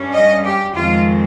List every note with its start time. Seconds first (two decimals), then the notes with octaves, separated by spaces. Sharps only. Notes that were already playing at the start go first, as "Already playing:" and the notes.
Already playing: G2 G3 C#4
0.13 D#5
0.44 G4
0.75 F2 D#3 G#3 C4 F4